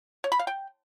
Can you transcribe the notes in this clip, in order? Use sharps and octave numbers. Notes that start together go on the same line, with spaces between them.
C#5
B5
F5
G5